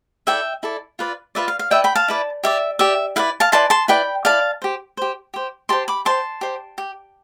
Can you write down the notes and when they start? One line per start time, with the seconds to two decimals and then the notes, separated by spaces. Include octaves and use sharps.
0.27 E4 A4 D5 E5 G5
0.63 E4 A4 D5
0.99 F4 B4 D5
1.35 F4 B4 D5 E5
1.48 F5
1.59 F5
1.70 E4 B4 D5 E5 G5
1.84 G5 B5
1.95 F5 A5
2.08 E4 B4 D5
2.43 G4 D5 E5
2.79 G4 D5 E5
3.16 E4 B4 D5 F5
3.40 F5 A5
3.52 E4 B4 D5 A5 C6
3.70 A5 C6
3.88 E4 B4 D5 G5 B5
4.25 E4 B4 D5 F5 A5
4.62 G4 C5
4.97 G4 C5
5.34 G4 C5
5.69 G4 C5 A5 C6
5.88 B5 D6
6.05 G4 C5 A5 C6
6.41 G4 C5
6.78 G4